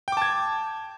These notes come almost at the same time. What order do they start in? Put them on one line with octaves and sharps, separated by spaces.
G5 D6 A5 G#6